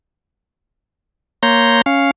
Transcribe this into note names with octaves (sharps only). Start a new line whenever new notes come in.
A#3 C#5 A#5 C6 G6
C#4 F5